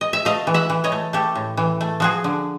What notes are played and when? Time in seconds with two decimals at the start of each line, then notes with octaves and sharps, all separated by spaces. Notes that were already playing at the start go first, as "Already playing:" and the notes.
0.01 D#5
0.13 E5
0.25 A3 D#5 F5
0.47 E3
0.54 E5 F#5
0.70 E3
0.84 C#5 D#5
0.92 A3
1.13 A3 G4 A4
1.35 A2
1.57 E3
1.81 A3
2.00 F3 F#4 G#4
2.24 D3